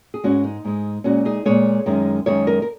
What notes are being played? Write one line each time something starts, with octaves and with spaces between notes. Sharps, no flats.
G#4
G#2 G#3 C#4 F#4
D#4
G#2 G#3
A#2 G#3 C#4 F#4
D#4 G#4
A#2 G#3 G#4 C#5
F#2 D#3 G#3
F#2 D#3 G#3 G#4 C#5
A#4 D#5
A#4